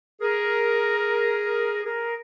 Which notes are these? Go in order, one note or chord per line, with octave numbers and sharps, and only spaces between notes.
G#4 A#4
G#4 A#4